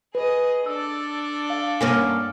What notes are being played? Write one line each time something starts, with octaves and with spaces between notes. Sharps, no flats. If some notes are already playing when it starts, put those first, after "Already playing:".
G#4 B4 D#5
D4 A4 D5 E6
F5
G2 A#3 C#4 G#5 D6 F6